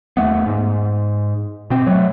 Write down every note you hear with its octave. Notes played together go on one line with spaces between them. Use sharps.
D#2 A3 B3
G#2
B2 C4
F#3 A3